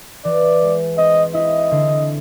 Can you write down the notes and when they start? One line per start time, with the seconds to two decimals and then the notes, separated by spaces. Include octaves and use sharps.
0.25 E3 D5
0.62 G#3
0.98 C4 D#5
1.34 E4 D#5
1.71 D3